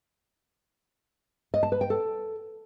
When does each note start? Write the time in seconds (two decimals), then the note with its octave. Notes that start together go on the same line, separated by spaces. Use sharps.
1.54 D#5
1.63 A5
1.72 B4
1.81 G5
1.90 A4